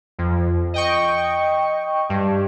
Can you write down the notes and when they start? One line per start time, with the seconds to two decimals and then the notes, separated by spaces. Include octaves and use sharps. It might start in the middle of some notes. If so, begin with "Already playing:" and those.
0.18 F2
0.74 D#5 G5 C#6
2.10 G2